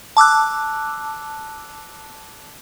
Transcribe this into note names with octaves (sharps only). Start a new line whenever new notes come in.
A5 D6 E6 F#6